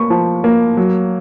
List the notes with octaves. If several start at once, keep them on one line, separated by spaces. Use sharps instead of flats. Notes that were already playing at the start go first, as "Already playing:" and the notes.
Already playing: A#3 B5 C#6
F3
A#3
F#3